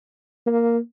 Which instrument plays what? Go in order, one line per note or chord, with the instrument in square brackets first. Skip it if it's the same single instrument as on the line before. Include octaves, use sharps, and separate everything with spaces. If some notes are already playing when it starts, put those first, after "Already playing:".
[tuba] A#3